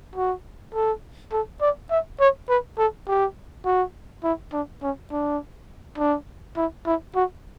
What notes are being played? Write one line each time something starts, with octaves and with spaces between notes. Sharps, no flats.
F#4
A4
A4
D5
E5
C#5
B4
A4
G4
F#4
E4
D4
C#4
D4
D4
E4
E4
F#4